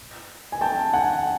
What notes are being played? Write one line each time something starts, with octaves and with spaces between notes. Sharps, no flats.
G#5
G5 A5
F#5 G#5